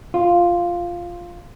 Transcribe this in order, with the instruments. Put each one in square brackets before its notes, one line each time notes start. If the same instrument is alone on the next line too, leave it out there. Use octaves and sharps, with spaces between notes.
[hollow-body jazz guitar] F4